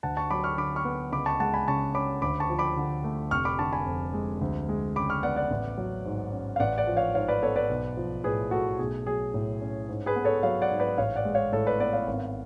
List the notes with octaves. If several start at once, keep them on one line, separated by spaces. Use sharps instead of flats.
D2 F#5 A5
A5 C#6
F#3 B5 D6
C#6 F6
D3 B5 D6
C#6 F6
B3
C#2 B5 D6
A5 C#6
G#3 F#5 A5
G#5 B5
C#3 A5 C#6
C#4 B5 D6
D2 B5 D6
A5 C#6
F3
B5 D6
D3
A3
F1 C#6 F6
B5 D6
D3 A5 C#6
G#5 B5
F2
G#3
D2
G#3
C#3 B5 D6
C#6 F6
B3 D5 F#5
D5 F#5
A1
F#3
G#2
C#4
F5
A1 D5 F#5
D5 F#5
F3
C#5 F5
G#2 C#5 F5
B4 D5
B3 A4 C#5
B4 D5
B1
F3
A2 G#4 B4
A3 F#4 A4
B1 G#4
F#3 G#4
A2
C#4
G#2
G#4 B4
B3
A4 C#5
F#3 C#5 F5
D5 F#5
G#2
B4 D5
A1 C#5 F5
D5 F#5
G#3
C#5 F5
A2 A4 C#5
B4 D5
B3 B4 D5
C#5 F5
G#1